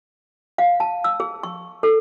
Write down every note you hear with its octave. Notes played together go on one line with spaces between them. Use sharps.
F5
A5
E6
G#4
C#6
A4